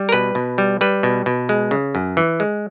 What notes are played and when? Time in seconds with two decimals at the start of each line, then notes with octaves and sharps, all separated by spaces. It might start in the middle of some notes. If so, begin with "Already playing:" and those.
Already playing: G3
0.09 A#4
0.12 B2 B4
0.35 B2
0.58 G3
0.81 G3 B4
1.03 B2
1.26 B2
1.49 G#3
1.71 C#3
1.95 F#2
2.17 E3
2.40 G#3